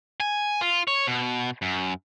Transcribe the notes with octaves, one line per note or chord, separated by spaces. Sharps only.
G#5
F4
C#5
B2
F#2